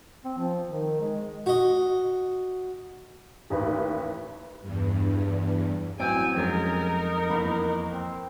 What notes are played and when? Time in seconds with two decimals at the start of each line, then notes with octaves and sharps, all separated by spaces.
0.24 C4
0.38 F3
0.66 D#3
1.00 G#3
1.46 F#4 D#5
3.50 A1 D#2 B4
4.61 E2 G2
6.00 A1 F#3 C4 G#5 D7
6.36 F2 F#3 G#3 C#4 D#4 A#4
7.30 E2 A#3 B5
7.93 C4